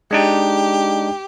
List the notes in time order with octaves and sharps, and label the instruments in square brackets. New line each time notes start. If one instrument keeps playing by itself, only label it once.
[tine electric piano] G#3 D4 D#4 [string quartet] G4